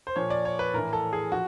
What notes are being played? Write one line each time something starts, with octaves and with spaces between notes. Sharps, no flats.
C5
A#2 F3 C#5
D5
C#5
B4
A2 E3 A#4
A4
G#4
F3 F#4